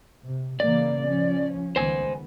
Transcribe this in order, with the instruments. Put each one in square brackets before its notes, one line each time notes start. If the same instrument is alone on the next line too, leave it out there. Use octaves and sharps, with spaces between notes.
[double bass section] C3
[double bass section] C#3 E3 A#3 [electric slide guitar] D5
[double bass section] F3 C#4
[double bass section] C#2 D#3 B3 [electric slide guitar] C5 G#5